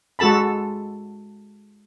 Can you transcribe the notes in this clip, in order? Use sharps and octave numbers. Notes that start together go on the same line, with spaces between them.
G#3 F#4 A4 A5 B5